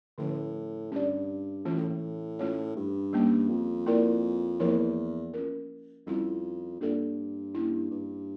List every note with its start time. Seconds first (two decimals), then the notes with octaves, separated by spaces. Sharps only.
0.18 A2 D3 F3 C#4
0.92 G2 C#4 G4 D5
1.65 A2 E3 A3 C#4 F4
1.77 A2
1.90 A2
2.39 A3 C#4 F4 C#5
2.77 G2
3.13 G3 A#3 C#4
3.49 F2
3.86 A#3 E4 A#4 D5
4.60 E2 F3 A#3 E4 A#4 C#5
5.34 C#4 F4 A#4
6.07 F2 G3 C#4 E4
6.80 G2 A#3 D4 F4 A4 D5
7.55 A#3 C#4 E4
7.91 G2